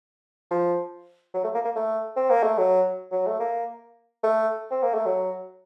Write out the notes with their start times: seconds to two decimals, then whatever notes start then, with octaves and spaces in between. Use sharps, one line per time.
0.51 F3
1.34 F#3
1.44 A3
1.54 A#3
1.65 A#3
1.76 A3
2.16 C4
2.30 A#3
2.43 A3
2.58 F#3
3.12 F#3
3.27 A3
3.40 A#3
4.23 A3
4.71 C4
4.83 A#3
4.94 A3
5.06 F#3